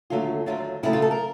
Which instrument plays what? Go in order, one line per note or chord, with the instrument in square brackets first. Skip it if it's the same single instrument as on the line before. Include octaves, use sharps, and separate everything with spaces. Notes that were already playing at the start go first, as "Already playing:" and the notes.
[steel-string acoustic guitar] D#2 D3 F#3 A3 F4
D#2 D3 F#3 A3 F4
F2 C#3 F#3 A3 E4
F4
A4
A#4